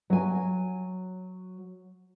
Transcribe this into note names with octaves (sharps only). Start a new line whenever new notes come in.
F#3 G#5